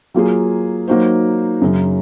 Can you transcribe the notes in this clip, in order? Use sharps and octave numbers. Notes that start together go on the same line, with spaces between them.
F#3 A#3 F4 G#4
F#3 A#3 D#4 F#4 C5
F#2 C#3 F#3